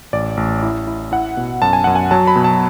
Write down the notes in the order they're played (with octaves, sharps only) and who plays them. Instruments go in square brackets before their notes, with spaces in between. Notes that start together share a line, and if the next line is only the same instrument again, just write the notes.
[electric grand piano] A1 D5
A1
E4
E4
E4 F#5
B2
F#2 A5
G#5
F#2 F#5
G#5
F#3 A5
B5
B2
A5